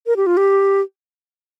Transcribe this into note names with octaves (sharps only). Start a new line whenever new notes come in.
A#4
G4
F4
G4